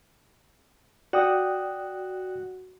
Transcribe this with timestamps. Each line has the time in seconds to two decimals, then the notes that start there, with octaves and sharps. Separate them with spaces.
1.13 F#4 D5 G5 D#6